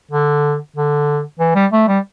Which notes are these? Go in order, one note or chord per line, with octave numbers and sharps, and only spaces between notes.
D3
D3
E3
G3
A3
G3